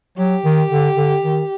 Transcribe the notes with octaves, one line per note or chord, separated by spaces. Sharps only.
F#3 G4
D#3
D3
D3
D#3